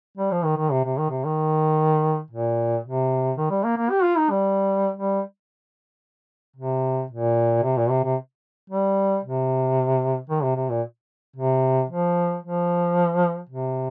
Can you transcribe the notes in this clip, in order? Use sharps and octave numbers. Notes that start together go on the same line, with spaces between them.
G3
F3
D#3
D#3
C3
C3
D#3
C3
D#3
A#2
C3
D#3
G3
A#3
A#3
G4
F4
D#4
G3
G3
C3
A#2
C3
A#2
C3
C3
G3
C3
D#3
C3
C3
A#2
C3
F3
F3
C3